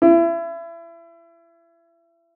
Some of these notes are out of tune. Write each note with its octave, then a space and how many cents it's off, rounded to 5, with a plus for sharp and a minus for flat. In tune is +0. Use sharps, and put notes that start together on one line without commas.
E4 +30